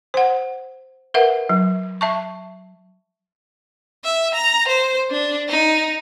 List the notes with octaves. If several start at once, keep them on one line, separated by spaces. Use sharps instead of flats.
C5 F#5
A#4 B4 E5 F#5
F#3
E5 A5 C#6
E5
A#5
C5
D4
D#4